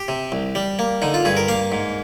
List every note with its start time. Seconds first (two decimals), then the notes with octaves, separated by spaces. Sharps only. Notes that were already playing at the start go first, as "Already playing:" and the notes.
Already playing: G4
0.08 C3
0.32 C2
0.55 G3
0.79 A#3
1.02 D3 D#4
1.14 F4
1.25 G2 G#4
1.37 A#4
1.48 A#3 F5
1.72 G#2